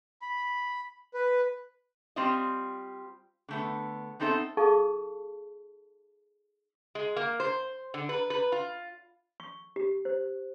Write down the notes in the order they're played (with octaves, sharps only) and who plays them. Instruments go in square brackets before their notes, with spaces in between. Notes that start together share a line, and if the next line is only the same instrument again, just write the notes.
[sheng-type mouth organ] B5
B4
[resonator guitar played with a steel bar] G3 C4 F4 C5 D5 D#5
D3 A3 B3
B3 C4 D#4 A4 C5 E5
[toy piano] D#4 G#4 A4 F5 A5 C#6
[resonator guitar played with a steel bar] G#3
A#3
C5
D3
B4
B4
F4
[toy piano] C#6
G4
C5